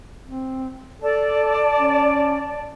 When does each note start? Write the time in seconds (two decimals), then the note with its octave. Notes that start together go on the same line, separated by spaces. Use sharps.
0.25 C4
1.02 A4 D5 A5
1.79 C#4